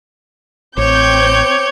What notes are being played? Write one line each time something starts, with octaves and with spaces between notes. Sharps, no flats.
A1 C4 C#5 D6 G6